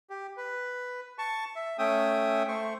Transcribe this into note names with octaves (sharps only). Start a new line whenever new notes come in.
G4
B4
A5 C#6
E5
A3 C#4 E5 G5 D#6
A3 C5 C#6